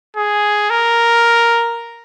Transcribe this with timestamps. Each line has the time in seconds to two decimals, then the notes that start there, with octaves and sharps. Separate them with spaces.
0.17 G#4
0.70 A#4